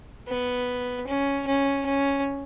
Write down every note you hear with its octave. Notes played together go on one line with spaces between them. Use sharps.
B3
C#4
C#4
C#4